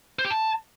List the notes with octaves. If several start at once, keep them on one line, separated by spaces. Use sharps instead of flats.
C5
G4
A5